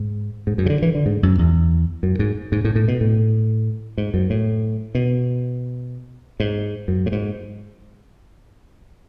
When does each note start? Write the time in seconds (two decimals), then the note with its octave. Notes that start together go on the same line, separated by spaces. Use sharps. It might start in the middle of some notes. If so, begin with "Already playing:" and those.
Already playing: G#2
0.47 G#2
0.58 F#2
0.66 C#3
0.70 D3
0.82 E3
0.95 D3
1.06 G#2
1.23 F#2
1.39 E2
2.03 F#2
2.19 G#2
2.52 G#2
2.65 A2
2.75 A2
2.88 B2
3.01 A2
3.98 G#2
4.14 F#2
4.30 A2
4.95 B2
6.40 G#2
6.88 F#2
7.06 A2
7.12 G#2